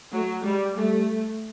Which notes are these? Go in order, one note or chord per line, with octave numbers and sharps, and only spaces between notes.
F#3 A3
G3 G#3
G3 A3